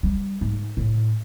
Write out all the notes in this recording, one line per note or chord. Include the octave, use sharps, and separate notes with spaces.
G3
G#2
A2